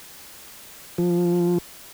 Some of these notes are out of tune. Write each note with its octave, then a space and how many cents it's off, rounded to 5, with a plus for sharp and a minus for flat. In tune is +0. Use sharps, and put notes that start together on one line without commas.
F3 +0